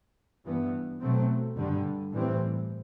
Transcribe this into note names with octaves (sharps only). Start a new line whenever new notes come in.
G2 E3 B3
B2 F#3 A3 C4
G2 D3 G3
A2 E3 G3 C4